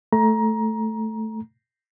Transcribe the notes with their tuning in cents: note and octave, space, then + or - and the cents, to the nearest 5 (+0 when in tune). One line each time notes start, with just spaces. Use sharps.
A3 +0 A#5 +20